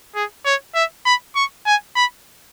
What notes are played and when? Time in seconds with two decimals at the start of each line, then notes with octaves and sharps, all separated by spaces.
0.15 G#4
0.45 C#5
0.75 E5
1.05 B5
1.35 C#6
1.66 G#5
1.96 B5